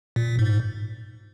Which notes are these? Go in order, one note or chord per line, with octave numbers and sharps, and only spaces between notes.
A#2
G#2